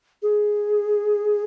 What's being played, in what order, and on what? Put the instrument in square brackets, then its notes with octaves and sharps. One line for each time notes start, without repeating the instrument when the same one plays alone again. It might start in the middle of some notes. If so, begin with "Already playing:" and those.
[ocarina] G#4